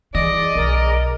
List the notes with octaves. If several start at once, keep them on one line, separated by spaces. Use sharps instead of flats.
E3 G#4 D5 D#5
B1 A#4